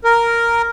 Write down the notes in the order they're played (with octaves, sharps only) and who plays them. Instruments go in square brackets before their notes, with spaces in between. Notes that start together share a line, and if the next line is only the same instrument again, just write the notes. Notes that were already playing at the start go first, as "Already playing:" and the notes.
[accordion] A#4